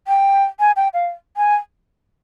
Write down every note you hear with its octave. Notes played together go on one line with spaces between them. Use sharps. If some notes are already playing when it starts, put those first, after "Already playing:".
G5
G#5
G5
F5
G#5